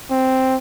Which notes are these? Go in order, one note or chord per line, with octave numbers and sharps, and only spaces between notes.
C4